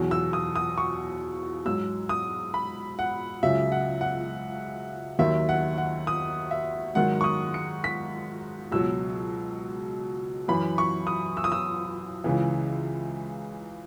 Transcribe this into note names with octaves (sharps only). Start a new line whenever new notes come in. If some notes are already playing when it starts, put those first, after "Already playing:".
Already playing: E2 B2 F#3
E6
D#6
D#6
C#6
G#2 F#3 E6
D#6
B5
F#5
C#2 C#3 F#3 E5
F#5
F#5
D#2 D#3 F#3 E5
F#5
F#5
D#6
E5
G#2 D#3 F#3 F#5
C#6
D#6
C#7
B6
C#2 B2 F#3 E6
F#2 E3 B5
C#6
D#6
E6
D#6
E6
C#2 C#3 E3